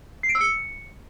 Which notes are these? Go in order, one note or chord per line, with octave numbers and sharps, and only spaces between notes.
C7
D7
E6
C#7